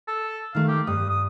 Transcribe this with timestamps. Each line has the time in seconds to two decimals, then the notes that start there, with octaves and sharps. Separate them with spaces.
0.08 A4
0.55 D#3 A3 F5
0.69 G4
0.87 G2 D#6
1.10 D#6